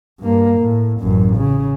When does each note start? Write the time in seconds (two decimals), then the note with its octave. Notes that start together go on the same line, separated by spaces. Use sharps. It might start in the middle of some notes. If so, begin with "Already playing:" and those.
0.20 G2 A#3
0.58 A2
1.00 A1 F#2
1.36 C#3